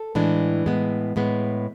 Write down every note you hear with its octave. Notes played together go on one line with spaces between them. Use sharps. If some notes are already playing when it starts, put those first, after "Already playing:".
Already playing: A4
A2 E3 G#3 D4
A2 G#3 B3
A2 G#3 B3